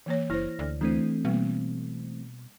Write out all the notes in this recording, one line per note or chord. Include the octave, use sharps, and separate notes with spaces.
E3 A#3 C#5
F#1 E4 C5 F6 A#6
D2 D5
E3 A3 C4 D4
B2 G3 A#3